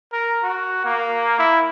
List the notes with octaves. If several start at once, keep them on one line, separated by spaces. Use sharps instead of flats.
A#4
F#4
A#3
E4